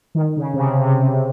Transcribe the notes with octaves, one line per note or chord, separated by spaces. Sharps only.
D#3
C#3
C3
C#3
C3